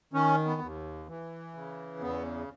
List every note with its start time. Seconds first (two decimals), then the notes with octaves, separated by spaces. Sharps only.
0.13 D#3 C#4
0.46 B3
0.61 D#2
1.07 E3
1.55 C#3
2.01 E2 B3